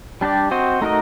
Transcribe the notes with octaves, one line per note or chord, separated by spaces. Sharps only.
G3 D4 G4 D5
C4 F#4 C5 D#5
A3 D#4 F#4 A#4 D#5